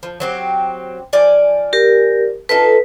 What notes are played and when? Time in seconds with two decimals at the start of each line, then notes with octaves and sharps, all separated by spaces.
0.03 F3
0.20 F#3 C4 G4
1.13 F3 D5 G#5
1.73 G4 A#4
2.49 D#4 F4 A4 B4